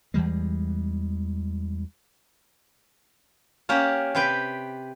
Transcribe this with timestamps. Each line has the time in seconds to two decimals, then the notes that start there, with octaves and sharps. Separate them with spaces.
0.14 E2 E3 G3 G#3
3.69 A#3 C#4 G4 F#5
4.15 C3 G4 B4 G5